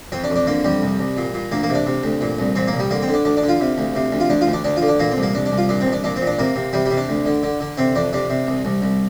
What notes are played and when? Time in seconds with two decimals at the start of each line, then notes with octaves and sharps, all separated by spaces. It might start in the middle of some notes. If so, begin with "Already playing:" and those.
0.12 F2 C4
0.24 D4
0.30 F2
0.36 D4
0.47 D3 A#3
0.65 F2 G3
0.82 C2
0.99 C2
1.17 A#2
1.34 A#2
1.52 D2 A#3
1.63 A#3
1.69 C3
1.75 D4
1.86 C3
2.03 D2
2.21 A#2
2.39 C2
2.56 A#2 C4
2.68 A#3
2.73 C2
2.79 G3
2.91 D3 A#3
3.02 C4
3.08 D3
3.14 D4
3.25 D2 D4
3.37 D4
3.43 D3
3.49 F4
3.60 C3
3.78 D2
3.95 C3
4.12 D2
4.20 F4
4.30 D2 D4
4.41 F4
4.47 D2
4.53 D4
4.64 D2 D4
4.77 F4
4.82 D3
4.88 D4
5.00 A#2 A#3
5.11 C4
5.17 C2
5.23 A#3
5.35 C2 D4
5.46 D4
5.52 C2
5.58 F4
5.69 A#2 D4
5.81 C4
5.87 C2
5.93 D4
6.04 A#2 D4
6.16 C4
6.21 A#2
6.27 D4
6.39 C3 A#3
6.56 C3
6.73 C3 G3
6.85 G3
6.91 C3
6.97 D4
7.09 D2
7.26 D3
7.43 D3
7.60 D3
7.77 C3 C4
7.95 F2 D4
8.13 C3 D4
8.30 C3
8.47 C2
8.65 C2
8.82 C2